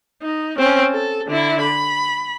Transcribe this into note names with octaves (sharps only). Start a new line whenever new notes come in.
D#4
C4 C#4
A4
D3 E4
B5